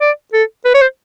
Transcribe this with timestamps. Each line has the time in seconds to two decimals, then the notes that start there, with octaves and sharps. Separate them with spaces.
0.01 D5
0.33 A4
0.65 B4
0.74 C#5
0.82 C5